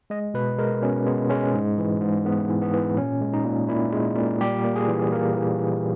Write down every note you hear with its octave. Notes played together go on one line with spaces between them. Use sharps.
G#3 D#5
B2 B4
G#3 A#4
B2 C#4
G#3 B3
G#3 C#4
G#2
E3
G#2
G#2 B3
E3
B3
E3
A#2 C#4
G#3
D#4
A#2
A#2 E4
G#3
A#2
G3 G4
A#3
G#4
E3
A#3 A#4
E3
E3